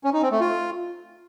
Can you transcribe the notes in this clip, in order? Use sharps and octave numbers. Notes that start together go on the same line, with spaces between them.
C#4
D#4
C4
A3
F4